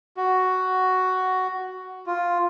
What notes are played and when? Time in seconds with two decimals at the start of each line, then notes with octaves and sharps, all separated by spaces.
0.17 F#4
2.06 F4